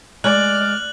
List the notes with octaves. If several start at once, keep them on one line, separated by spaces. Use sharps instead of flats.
G#3 D5 F6 F#6 F#7